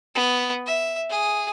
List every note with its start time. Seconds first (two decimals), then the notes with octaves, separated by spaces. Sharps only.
0.15 B3
0.67 E5
1.10 G#4